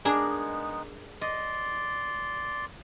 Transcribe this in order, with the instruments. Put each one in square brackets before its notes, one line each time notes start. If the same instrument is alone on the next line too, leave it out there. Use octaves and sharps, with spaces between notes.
[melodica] G#3 B3 D#4 [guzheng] D4 G#4 A#4
[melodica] D5 C6 [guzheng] D#5